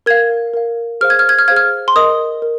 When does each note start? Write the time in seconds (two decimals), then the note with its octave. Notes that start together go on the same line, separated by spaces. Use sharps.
0.06 A#4 F5 G#6
0.54 A#4 F5
1.01 G#4 C5 F5 F6
1.10 G#6
1.19 F6
1.29 G#6
1.39 F6
1.48 G#4 C5 F5 G#6
1.56 F6
1.88 C6
1.95 A#4 D#5 D#6
2.42 A#4